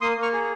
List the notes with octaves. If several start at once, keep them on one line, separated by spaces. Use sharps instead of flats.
A#3 C6 D#6
A#3
C#6 F6
G#4